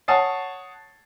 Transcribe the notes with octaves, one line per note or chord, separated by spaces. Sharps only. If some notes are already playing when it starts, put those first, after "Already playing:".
C#5 F#5 A5 D#6 A6 C7